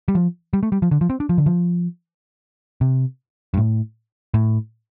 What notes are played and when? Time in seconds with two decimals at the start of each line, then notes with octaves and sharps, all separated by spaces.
0.08 G3
0.15 F3
0.53 G3
0.63 A3
0.72 G3
0.82 F3
0.91 D3
1.01 F3
1.10 C4
1.20 D4
1.29 F3
1.38 D3
1.46 F3
2.81 C3
3.54 G2
3.57 A2
4.34 A2